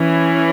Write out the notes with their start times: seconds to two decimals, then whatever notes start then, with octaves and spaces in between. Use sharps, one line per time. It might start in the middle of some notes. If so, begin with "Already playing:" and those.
Already playing: E3 C#4